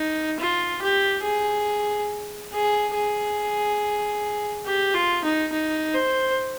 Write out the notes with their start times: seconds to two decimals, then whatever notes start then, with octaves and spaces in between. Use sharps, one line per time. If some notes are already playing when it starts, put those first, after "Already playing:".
Already playing: D#4
0.39 F4
0.82 G4
1.24 G#4
2.53 G#4
2.95 G#4
4.66 G4
4.94 F4
5.24 D#4
5.52 D#4
5.94 C5